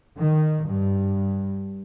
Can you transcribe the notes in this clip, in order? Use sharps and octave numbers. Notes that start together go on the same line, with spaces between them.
D#3
G2